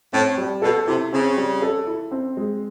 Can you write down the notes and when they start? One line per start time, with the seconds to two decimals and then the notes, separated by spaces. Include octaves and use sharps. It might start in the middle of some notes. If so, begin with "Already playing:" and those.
0.13 A2 C4
0.38 G3
0.62 B2 A4
0.87 C3 E4
1.13 C#3 C4
1.37 G3
1.62 A4
1.87 E4
2.12 C4
2.37 G#3